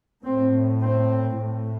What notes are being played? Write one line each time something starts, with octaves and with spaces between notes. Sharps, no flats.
A2 C4
C4
A2